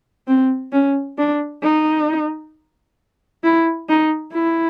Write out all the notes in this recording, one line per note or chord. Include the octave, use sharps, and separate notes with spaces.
C4
C#4
D4
D#4
E4
D#4
E4